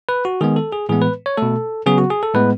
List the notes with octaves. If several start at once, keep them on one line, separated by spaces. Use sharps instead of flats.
B4
F#4
D#3 G#3 B3 G#4
A4
G#4
A2 E3 G#3 B3 G#4
B4
C#5
B2 A3 A4
C#3 F#3 B3 G#4
F#4
G#4
A4
A2 G#3 B3 B4